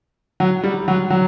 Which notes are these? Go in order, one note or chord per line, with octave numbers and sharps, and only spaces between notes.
F#3
G3
F#3
F#3